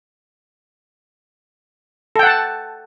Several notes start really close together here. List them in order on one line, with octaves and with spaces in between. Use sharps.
A4 G5 F#5 A5